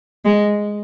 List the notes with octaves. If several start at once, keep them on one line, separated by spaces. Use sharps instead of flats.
G#3